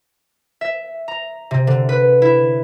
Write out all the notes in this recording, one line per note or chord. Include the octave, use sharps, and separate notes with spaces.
E5
A#5
C3
D3
B4
E4